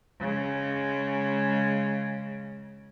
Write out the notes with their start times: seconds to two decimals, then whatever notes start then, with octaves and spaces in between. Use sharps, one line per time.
0.20 C#3 G#3